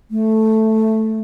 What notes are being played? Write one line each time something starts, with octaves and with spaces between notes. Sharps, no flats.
A3